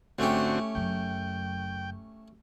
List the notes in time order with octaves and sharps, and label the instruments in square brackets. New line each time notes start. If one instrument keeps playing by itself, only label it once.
[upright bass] G#1 [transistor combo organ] D3 C4 F#4 [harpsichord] A3 C#4 G4
[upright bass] F#1 F#2 [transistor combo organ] G5